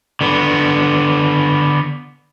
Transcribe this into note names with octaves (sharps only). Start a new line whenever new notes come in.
D3 B3